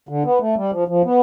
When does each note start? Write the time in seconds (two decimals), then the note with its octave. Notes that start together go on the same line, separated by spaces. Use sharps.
0.09 D3
0.24 B3
0.41 A3
0.57 G3
0.72 F3
0.88 F3
1.05 B3